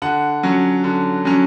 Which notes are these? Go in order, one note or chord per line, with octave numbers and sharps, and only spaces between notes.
D3 F#5
F#3 C#4
D3
F#3 C#4